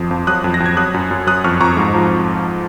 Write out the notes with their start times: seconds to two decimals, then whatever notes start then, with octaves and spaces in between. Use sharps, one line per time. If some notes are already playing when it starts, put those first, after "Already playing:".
Already playing: F2 F3 C6 D#6
0.11 F2
0.27 F#3 D#6 F#6
0.44 F2
0.54 A#6
0.60 F2
0.66 G#6
0.77 F#3 D#6 F#6
0.94 F#2
1.11 F#2
1.27 F#3 D#6 F#6
1.44 F2 C#6 F6
1.61 F2 A#5 C#6
1.77 G#2
1.94 F3